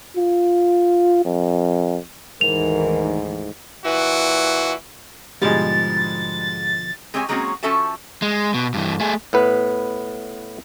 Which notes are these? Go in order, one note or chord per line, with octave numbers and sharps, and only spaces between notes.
F4
F2
D2 G#2 D#3 E3 A#4 F7
A#2 E3 E4 F#4
G#2 B2 D3 F3 G3 G#3 A6
G#3 C4 G4 C#5 G#5
F#3 G#3 A#3 C4 C#4 F#4
F3 C#4 F#4 A4 E5 A5
G#3
B2
G2 E3
A3 G#4
A2 B3 B4